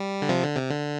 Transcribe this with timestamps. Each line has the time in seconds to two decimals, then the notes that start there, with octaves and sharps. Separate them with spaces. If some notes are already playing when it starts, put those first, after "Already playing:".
Already playing: G3
0.22 D3
0.29 C3 F3
0.43 D3
0.56 C3
0.70 D3